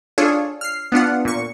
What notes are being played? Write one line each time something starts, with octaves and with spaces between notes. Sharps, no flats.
D4 F4 G#4 A4 C#5
F6 C7
B3 D4 F4 F#5
A#2 C#6